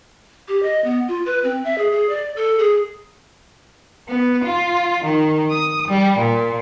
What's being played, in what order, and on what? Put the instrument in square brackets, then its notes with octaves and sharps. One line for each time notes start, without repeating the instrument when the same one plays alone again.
[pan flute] G4
D#5
B3
F4
B4
C4
E5
G#4
G#4
D5
A4
G#4
[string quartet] B3
F4
D#3
D#6
G3
A#2